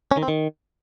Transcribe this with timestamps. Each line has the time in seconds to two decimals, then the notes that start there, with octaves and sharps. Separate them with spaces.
0.11 C#4
0.17 D#3
0.23 C4
0.28 D#3